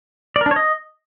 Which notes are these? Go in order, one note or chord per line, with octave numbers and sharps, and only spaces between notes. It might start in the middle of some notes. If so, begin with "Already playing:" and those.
D5
A#4
D4
C#5
D#5